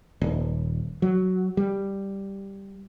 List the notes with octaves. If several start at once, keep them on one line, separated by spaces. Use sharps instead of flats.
D#1
F#3
G3